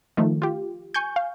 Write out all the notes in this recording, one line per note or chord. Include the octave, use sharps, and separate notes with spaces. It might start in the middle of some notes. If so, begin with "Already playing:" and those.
D#3 F3 A3
F4 G4
G#5 C#6 G6
F5